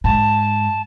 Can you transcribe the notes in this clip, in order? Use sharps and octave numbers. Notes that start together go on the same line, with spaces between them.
G#2 A5